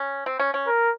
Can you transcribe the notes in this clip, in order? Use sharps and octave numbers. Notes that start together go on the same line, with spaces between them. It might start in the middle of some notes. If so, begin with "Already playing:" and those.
Already playing: C#4
C4
C#4
C#4
A#4